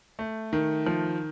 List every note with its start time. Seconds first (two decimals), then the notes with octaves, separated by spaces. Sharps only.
0.19 A3
0.53 D#3
0.86 F3